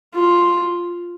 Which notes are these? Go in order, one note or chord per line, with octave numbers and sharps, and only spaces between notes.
F4